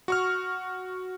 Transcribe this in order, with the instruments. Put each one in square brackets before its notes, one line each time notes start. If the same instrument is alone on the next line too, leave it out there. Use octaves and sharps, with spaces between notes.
[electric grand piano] F#4 C#6 F6